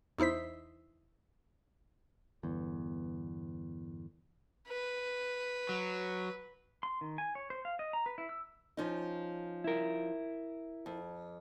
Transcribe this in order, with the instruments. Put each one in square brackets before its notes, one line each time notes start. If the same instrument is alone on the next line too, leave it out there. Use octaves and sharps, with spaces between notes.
[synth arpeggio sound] E2 D#4 E4 C5 B6
[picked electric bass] G1 E2
[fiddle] B4
[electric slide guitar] F#3
[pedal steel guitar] C6
D#3
G#5
C#5
C5
F5
D#5
A#5
B4
E4
E6
[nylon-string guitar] F3 C#4 D#4
[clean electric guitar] E4 A#4
[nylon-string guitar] F2